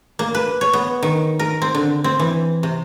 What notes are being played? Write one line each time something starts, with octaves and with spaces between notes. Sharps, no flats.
A#3
B4
C#5
B3
D#3
A#4
C4
D3
C4
E3
C3